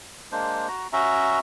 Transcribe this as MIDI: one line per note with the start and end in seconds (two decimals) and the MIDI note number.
0.32 0.68 56
0.32 0.68 58
0.32 0.68 62
0.32 0.68 72
0.68 0.87 66
0.68 0.87 82
0.93 1.39 61
0.93 1.39 66
0.93 1.39 76
0.93 1.39 82